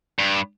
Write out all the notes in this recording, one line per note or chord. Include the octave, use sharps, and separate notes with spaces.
G2